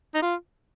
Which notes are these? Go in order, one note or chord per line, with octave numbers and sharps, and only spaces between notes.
D#4
F4